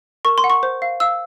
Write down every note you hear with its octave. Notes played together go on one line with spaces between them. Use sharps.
A#4 C#6
C6
F#5
C#6
C5
F5
F5 E6